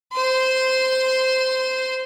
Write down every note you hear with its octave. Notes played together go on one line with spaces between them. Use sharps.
C5 C6